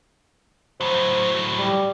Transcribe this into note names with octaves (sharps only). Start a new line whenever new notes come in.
A2 F#3 C5
G3